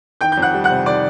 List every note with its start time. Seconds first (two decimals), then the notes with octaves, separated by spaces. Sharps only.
0.21 D#3 G5 G6
0.32 G6
0.37 F2
0.42 F#5 F#6
0.54 G3
0.64 F#5 F#6
0.70 C3
0.86 D#3 D5 D6